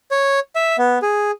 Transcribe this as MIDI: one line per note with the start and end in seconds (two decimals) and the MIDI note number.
0.11 0.40 73
0.56 0.76 76
0.78 0.99 59
1.02 1.31 68